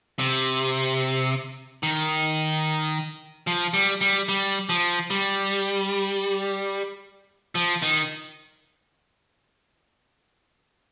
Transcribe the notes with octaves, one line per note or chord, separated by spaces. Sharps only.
C3
D#3
F3
G3
G3
G3
F3
G3
F3
D#3